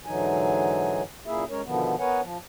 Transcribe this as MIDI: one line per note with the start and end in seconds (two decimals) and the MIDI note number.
0.06 1.03 44
0.06 1.03 50
0.06 1.03 52
0.06 1.03 54
0.06 1.03 63
0.06 1.03 80
1.26 1.44 42
1.26 1.44 46
1.26 1.44 58
1.26 1.44 64
1.26 1.44 68
1.26 1.44 76
1.50 1.61 56
1.50 1.61 61
1.50 1.61 70
1.50 1.61 73
1.66 1.96 47
1.66 1.96 50
1.66 1.96 51
1.66 1.96 53
1.66 1.96 59
1.99 2.21 59
1.99 2.21 70
1.99 2.21 71
1.99 2.21 73
1.99 2.21 78
1.99 2.21 80
2.22 2.38 53